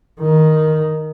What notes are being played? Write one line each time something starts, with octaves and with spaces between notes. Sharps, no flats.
D#3